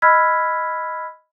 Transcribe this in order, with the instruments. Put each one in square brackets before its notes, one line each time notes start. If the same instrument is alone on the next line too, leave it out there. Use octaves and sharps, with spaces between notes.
[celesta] D#5 B5 E6 F6 G#6 B6